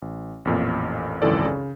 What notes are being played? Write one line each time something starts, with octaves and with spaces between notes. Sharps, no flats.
A1
A1 F2 A#2
G#1 C#2 F#2 E3 A4 D5
C#3